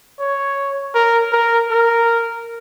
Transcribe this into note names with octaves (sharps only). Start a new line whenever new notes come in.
C#5
A#4
A#4
A#4